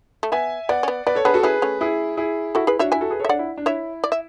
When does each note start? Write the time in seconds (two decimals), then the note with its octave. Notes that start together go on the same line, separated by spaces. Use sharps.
0.23 A3
0.32 B3 E5 G#5
0.69 B3 D5 F#5
0.83 C#4
0.88 B3
1.06 B3 B4 D5
1.15 A4 C#5
1.25 B3 D4 G#4 B4
1.34 F#4 A4
1.43 C#4 E4 G#4 B4
1.62 A3 C#4
1.81 E4 G#4
2.17 E4 G#4
2.55 E4 F#4 A4
2.67 E4 G#4 B4
2.79 D4 F#4 C#5 E5
2.92 E4 E5 G#5
3.01 F#4 A4
3.11 G#4 B4
3.20 A4 C#5 E5
3.29 D4 D5 F#5
3.39 E4
3.58 D4
3.66 E4 C#5 E5
4.04 D5
4.12 E5